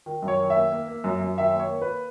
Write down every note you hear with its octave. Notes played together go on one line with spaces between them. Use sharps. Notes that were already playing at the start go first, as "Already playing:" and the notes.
D#3
F#2
C#5
D#3
E5
A#3
A#3
A#3
F#2
F#2
D#3 E5
A#3
C#5
A#3
B4